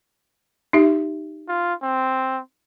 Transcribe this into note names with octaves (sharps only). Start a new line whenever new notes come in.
D#4 G4 E5
F4
C4